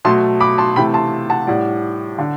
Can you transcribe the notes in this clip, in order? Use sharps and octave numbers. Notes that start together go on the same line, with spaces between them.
B2 F#3 A3 A5 C6
B5 D6
A5 C6
C3 E3 A3 G5 B5
A5 C6
F#5 A5
A2 G3 D5 F#5
D3